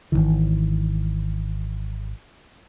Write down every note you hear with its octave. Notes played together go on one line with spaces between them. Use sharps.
G#1 D2 D#3 E3